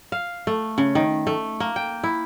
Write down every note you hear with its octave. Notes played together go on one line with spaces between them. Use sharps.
F5
A3
C#3
D#3
A3
A#3
G5
E4